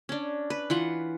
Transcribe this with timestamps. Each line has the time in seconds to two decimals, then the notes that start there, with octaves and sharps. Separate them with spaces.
0.09 C#4 D4
0.50 B4
0.70 E3 F4 F#5